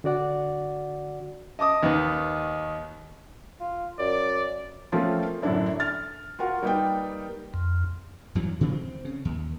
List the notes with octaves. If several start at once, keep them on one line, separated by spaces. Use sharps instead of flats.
D3 F#4 D5 F#5
D#5 A5 D6 D#6
D#2 D#3 B4
F4
F#2 D5
F3 A3 A#3 C4 C#4 F4
F#2 A2 D3 D4 E4
F6 A6
F4 F#4 A#4 F#5
G3 A#3 D#4 B4 G5
F2
E2 G2 E3 F#3
C3 D#3 F#3 C4
C4
C#3
D#2